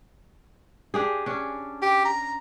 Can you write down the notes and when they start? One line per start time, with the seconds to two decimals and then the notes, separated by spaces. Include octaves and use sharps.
0.94 D4 G4 G#4
1.26 C#4 D4
1.82 G4
2.05 A#5